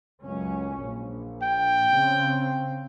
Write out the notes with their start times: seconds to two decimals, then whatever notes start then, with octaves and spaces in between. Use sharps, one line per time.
0.23 C#2 F#2 C#4
0.84 A#1
1.43 G5
1.91 C#3 C4